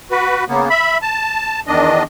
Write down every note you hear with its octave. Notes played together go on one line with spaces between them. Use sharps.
F#4 B4
C#3 A#3 B3
E5 B5
A5
E2 D#3 D4 D#5